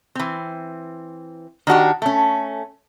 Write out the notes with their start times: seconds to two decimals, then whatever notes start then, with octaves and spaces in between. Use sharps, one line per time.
0.15 E3 C4
1.67 D#3 D4 F#4 G4
2.02 A3 C#4